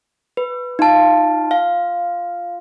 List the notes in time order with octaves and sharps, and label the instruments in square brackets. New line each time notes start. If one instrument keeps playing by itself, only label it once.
[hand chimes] B4
[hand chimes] D#4 A5 [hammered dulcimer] F4
[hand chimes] F5